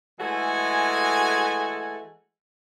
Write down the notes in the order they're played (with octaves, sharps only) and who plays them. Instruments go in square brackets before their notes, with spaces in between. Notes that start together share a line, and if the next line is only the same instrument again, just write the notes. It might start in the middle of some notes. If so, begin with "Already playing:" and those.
[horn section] E3 G#3 A3 F#4 A4 G#5